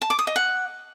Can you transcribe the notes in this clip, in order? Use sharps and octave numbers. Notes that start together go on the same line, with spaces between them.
A5
D6
D#6
D#5
F#5